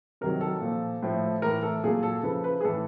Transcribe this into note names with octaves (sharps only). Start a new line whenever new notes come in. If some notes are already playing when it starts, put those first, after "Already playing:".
C3 D#3 F#3 A#4
A4
A#2 F3
A2 F3
A2 E3 A#4
A4
A#2 F#3 G#4
A4
C#3 F3 B4
B4
G#4
A2 E3 A4